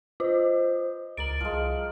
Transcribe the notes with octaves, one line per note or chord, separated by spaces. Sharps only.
F4 C5 D#5
C#2 A#4 D5 A6 D7 F#7
C2 F3 G#3 F6